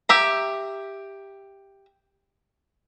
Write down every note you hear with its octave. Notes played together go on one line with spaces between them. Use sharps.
G4 E5 A#5